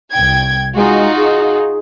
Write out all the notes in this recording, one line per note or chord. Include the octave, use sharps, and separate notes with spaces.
C2 G5 G#6
G#3 D#4 F4 F#4
G#4